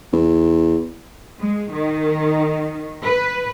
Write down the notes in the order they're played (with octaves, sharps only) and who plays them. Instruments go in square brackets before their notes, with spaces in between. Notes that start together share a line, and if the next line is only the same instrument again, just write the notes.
[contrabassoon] E2
[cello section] G#3
D#3
B4